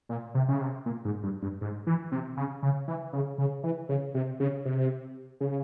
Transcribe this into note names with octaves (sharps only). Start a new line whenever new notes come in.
A#2
C3
C#3
C3
A#2
G#2
G2
G2
G#2
E3
C3
C#3
C#3
E3
C#3
C#3
E3
C#3
C3
C#3
C3
C#3